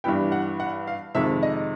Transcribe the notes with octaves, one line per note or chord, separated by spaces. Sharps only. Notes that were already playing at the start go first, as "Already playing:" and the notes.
G2 E3 G3 B3 E4 G5
F#5
F#5
F5
F2 C3 D#3 G#3 E5
D#5